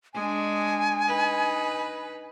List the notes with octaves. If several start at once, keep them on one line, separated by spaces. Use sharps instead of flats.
G#3 D4 G#5
D#4 B4